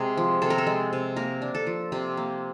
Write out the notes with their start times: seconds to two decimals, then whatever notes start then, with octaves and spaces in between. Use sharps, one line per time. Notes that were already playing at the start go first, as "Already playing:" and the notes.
Already playing: C3 G#3 G#4
0.17 F3
0.42 C3 A4
0.50 A#4
0.58 A4
0.67 G#3
0.93 C3
1.16 A#3 A#4
1.42 D4
1.55 A4
1.67 F3
1.92 C3 G4
2.17 A#3